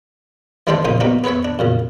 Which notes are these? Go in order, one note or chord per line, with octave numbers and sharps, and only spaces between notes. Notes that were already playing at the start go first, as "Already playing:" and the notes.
E3 G3 G#3 D4 A4 C5
A#1 C#3 D#4 C5 D#6
F#3 G3 A#3 B3 D#4
B3 G#4 B4 C#5 E5
D4
F#2 A#2 C#3